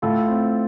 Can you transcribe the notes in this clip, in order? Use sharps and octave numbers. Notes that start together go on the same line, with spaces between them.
A2 F4 A4
C4